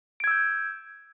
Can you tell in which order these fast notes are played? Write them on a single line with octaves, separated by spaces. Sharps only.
D7 G#6 E6 G6